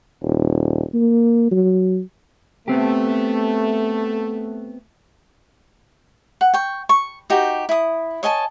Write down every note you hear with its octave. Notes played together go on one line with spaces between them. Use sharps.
D#1
A#3
F#3
A3 B3 C4 G4
F#5
G5 C#6
C#6
D#4 F#4 G4
E4 D#6
C#5 D#5 G#5 A5